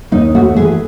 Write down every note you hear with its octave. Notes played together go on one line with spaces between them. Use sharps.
D#2 D#4
A3 F#4
E3 G#4